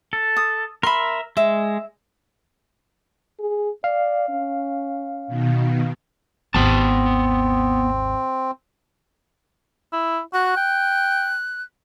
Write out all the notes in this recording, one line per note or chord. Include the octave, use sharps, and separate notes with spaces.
A4
D#6
A#4 E5 B5 C6
G#3 E5
G#4
D5 F5
C#4
B2 D#3
G#1 D#2 B3 C4 A5
E4
F#4 F#6
G5